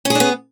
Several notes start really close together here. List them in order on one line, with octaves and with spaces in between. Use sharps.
C#4 G#4 D4 B3